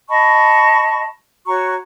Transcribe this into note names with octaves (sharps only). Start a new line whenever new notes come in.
D#5 A5 B5 C#6
F#4 C#5 A#5 C#6